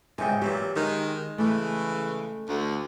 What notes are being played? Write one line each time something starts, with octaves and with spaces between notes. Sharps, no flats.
C#2 G#2 C3 G5 G#5
A#2 E3 F#3 G4
D#3 G#3
C#3 E3 A3
D2